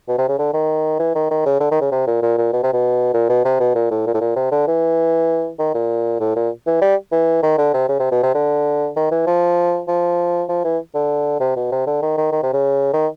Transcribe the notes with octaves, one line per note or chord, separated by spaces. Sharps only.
B2
C3
C#3
D3
D#3
E3
D#3
D#3
C#3
D3
D#3
C#3
C3
A#2
A#2
A#2
B2
C3
B2
A#2
B2
C3
B2
A#2
A2
A#2
A2
A#2
C3
D3
E3
D#3
A#2
A2
A#2
E3
G3
E3
D#3
D3
C3
C#3
C3
B2
C3
D3
D#3
E3
F3
F3
F3
E3
D3
C3
B2
C3
D3
D#3
D#3
D#3
C3
C#3
D#3